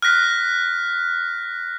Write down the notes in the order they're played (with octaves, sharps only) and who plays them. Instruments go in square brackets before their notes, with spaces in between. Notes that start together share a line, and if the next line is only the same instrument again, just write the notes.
[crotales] F6 F#6 A#6 B6